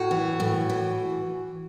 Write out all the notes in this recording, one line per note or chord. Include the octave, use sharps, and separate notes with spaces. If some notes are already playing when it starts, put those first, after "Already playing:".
Already playing: A2 F#4
E3
A2
E3